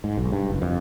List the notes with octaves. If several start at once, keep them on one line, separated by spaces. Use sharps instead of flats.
G#2
B1
G2
F#1
F2